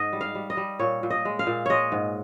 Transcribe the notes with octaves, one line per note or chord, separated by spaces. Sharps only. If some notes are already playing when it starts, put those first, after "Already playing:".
Already playing: G#2 D#5
G3
F5
G3
D#5
G3
A#2 C#5
A#2
D#5
G#3
F5
A#2
G#3 C#5 D#5
G#2